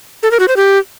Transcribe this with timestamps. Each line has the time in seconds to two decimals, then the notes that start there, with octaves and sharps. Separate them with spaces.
0.23 A4
0.31 A#4
0.40 F#4
0.48 C5
0.57 G4